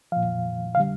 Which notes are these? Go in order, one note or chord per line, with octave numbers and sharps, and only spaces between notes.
A#2 F3 F5
F5
D3 G3